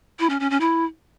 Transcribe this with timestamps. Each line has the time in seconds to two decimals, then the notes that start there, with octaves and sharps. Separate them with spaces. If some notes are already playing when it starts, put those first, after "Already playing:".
0.19 E4
0.30 C#4
0.40 C#4
0.50 C#4
0.61 E4